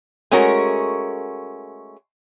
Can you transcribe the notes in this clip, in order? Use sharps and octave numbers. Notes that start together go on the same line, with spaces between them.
G#3 A3 C#4 F#4 A#4